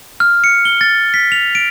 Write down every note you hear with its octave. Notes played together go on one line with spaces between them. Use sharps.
F6
C#7
G7
A6
B6
F7
D7